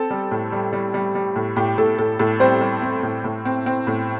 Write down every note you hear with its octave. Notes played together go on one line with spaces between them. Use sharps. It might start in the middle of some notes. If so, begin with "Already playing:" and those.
Already playing: C4 A4 A5
G3
A2
G3
G3
G3
G3
A2
A2 G4 G5
A2 A4
A2 A4
A2 A4
G3 C4 C5
G3
C4
A2
A2
C4
C4
A2